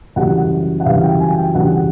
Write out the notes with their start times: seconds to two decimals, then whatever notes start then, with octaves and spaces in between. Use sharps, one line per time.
0.16 F#2 C#3 E3 G3 F#5
0.80 F#5
0.86 F#2 C#3 E3 G3 F5
1.03 G5
1.20 G#5
1.38 G5
1.55 F#2 C#3 E3 G3 F#5